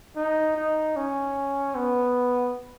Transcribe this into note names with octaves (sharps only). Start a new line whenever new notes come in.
D#4
D#4
C#4
B3